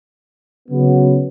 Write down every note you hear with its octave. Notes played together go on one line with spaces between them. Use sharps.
C#3 F#3 B3